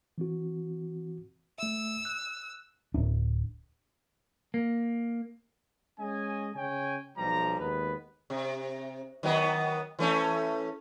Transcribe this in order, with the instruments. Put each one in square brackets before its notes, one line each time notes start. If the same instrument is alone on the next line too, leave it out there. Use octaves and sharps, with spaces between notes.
[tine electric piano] E3 C4 F#4
[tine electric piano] A3 E5 [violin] E6
[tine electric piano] F#6
[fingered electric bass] D1 D4
[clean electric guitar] A#3
[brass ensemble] G#3 C#4 D#5 G#5
C#3 C#5 G5 G#5
B1 F3 G3 A#5
D#2 G#3 B3 B4
[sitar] C3
D#3 F#3 B3
E3 A3 C#4